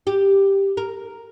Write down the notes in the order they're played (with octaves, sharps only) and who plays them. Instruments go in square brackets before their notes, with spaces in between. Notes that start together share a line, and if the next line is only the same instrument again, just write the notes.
[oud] G4
A#4